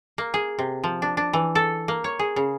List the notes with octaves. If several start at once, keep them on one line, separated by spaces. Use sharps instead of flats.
A#3
G#4
C3
F3
D4
D4
E3
A4
A#3
C#5
G#4
C#3